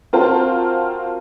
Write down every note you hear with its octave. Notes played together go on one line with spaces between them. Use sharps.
C4 F4 F#4 A#4 C5 A5